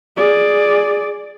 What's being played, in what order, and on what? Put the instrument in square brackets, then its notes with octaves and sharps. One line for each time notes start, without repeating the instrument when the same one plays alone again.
[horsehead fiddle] G#4 D5